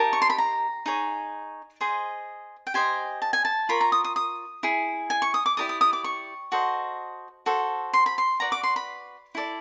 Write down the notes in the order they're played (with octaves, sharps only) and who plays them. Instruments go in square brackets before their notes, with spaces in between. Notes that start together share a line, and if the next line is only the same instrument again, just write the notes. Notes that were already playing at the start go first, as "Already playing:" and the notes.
Already playing: [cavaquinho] D#4 G4 A#4 A5
C#6
C6
B5
A#5
D#4 G#4 C#5
G#4 C5 D#5
G5
G4 C5 D#5 G#5
A5
G#5
A5
F4 A#4 C#5 B5
A#5
D#6
D#6
D#6
E4 G#4
G#5
C#6
D#6
D6
E4 G4 A#4 D5 D#6
D#6
D#6
D6
C#6
F#4 A4 C5 D#5
F#4 A4 C5
C6
B5
C6
F#4 B4 D5 A#5
D6
C6
B5
E4 A4 D5